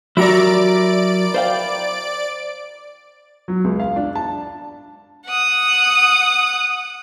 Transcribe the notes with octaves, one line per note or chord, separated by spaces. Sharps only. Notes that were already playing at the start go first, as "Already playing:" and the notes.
F#3 E4 F#4 G4 A#4 D5 A#5 D7
C5 F5 G5
F#3
C#2
F5
D4
A5
F#5 D#6